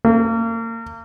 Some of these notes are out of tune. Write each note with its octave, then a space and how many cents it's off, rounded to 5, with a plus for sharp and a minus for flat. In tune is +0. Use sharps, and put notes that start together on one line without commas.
A#3 -35